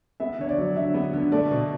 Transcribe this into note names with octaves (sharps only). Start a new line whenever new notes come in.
B3 E5
D3 C#5
D5
F#3
D3 E5
B3
D3
A3 D5
B2